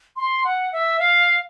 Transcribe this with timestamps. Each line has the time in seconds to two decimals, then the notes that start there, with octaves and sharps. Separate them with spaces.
0.16 C6
0.44 F#5
0.72 E5
0.99 F5